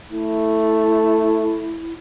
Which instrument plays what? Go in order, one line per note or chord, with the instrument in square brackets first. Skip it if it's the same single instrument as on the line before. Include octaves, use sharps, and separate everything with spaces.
[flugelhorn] A3 [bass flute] E4